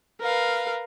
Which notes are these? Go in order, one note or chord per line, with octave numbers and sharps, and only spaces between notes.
A#4 B4 F5